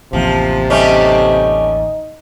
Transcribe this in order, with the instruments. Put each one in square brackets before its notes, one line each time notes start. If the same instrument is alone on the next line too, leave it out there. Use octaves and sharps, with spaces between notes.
[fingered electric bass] A1 D#2 [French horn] C3 [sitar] F3
[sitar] G3 A3 C#4 [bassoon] D#4